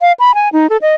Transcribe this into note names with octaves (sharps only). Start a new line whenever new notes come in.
F5
B5
G#5
D#4
A4
D#5